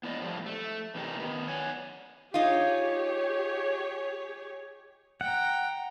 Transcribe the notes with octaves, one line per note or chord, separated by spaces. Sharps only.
B3 E4 D5 D#5
A2 F3 G3
A3
E2 A2 C3 D#4 G4 A#4
D#3 B3
C#5 D5 F#5 G#5
D#4 F4 G4 G#4 C#5
F#5 G5 A#5